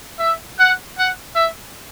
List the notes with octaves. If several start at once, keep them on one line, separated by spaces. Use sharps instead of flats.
E5
F#5
F#5
E5